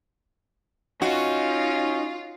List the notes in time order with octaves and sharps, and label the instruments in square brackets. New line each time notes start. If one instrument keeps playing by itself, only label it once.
[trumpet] C#4 [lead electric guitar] D#4 [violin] F4 [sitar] F#4